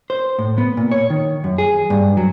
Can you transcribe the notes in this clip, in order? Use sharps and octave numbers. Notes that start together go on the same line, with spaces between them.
C5
A2
B3
A#2
C#5
D#3
F#2
G#4
G2
F#3